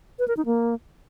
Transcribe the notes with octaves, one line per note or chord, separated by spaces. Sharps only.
B4
A#4
D#4
A#3